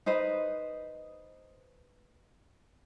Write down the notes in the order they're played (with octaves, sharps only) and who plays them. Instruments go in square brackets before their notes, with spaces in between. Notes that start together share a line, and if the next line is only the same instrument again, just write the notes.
[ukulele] D#4 B4 C5 D#5